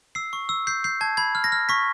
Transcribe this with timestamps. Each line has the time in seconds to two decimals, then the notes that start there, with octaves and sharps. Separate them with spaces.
0.15 E6 C7
0.33 C#6
0.49 E6
0.67 G6 C7
0.84 G6 C7
1.01 A5 G#6
1.17 B5 G#6
1.35 F6
1.44 A#6
1.52 F6
1.69 C#6 B6